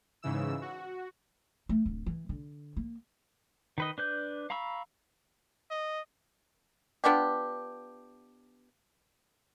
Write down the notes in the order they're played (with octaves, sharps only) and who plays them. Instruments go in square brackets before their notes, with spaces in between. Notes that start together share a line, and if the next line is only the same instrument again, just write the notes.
[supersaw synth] G#2 C#3 E3 E6
F#4
[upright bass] A3
D1
E3
D3
A#3
[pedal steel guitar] D#3 B4 D#5
D4 B4 G6
F5 A#5 B5 C#6 E6
[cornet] D#5
[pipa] B3 D4 F4 G4